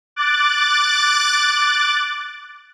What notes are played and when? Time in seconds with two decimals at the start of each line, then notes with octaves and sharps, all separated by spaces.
0.16 D6 F#6 A6